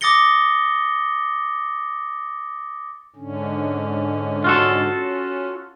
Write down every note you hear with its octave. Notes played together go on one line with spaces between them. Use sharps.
D6 D#6 A6 A#6 C#7 G7
G#2 D3 C#4
F4 F#4 A4
C#4